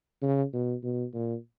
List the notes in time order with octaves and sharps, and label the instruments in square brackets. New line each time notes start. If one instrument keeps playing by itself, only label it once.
[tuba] C#3
B2
B2
A#2